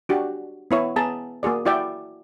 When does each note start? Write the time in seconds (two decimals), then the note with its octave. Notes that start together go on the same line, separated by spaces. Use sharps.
0.09 D4 F#4 G4
0.71 B3 E4 C#5
0.96 B3 G#4 A5 A#5
1.43 A#3 F#4 G#4 D5
1.65 E4 F#4 D5 E5 G5